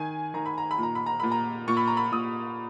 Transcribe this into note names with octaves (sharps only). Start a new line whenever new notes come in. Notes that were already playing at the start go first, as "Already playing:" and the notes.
Already playing: D#3 G#5
D#3 A#5
B5
A#5
B5
A#2 A#5
B5
A#5
A#2 B5
A#5
A#2 C#6
B5
A#5
B5
A#2 D#6